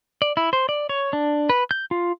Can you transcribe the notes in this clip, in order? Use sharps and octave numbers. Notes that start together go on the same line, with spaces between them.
D5
E4
C5
D5
C#5
D4
B4
G6
F4